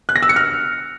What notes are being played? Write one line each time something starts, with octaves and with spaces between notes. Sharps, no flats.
F#6
A#6
E6
C#7
F6